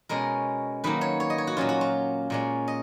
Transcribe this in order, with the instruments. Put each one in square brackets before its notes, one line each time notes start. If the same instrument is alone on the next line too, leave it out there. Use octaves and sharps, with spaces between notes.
[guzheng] B2 G#3 C#4 A#4
D#3 F#3 A#3 B4
C#5
C#5
D#5
C#5
F#4
A#2 F#3 C#4 F4
F#4
F4
A#2 G#3 C#4
D#5